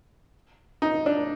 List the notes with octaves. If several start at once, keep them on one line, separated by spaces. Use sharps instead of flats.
D#4
D4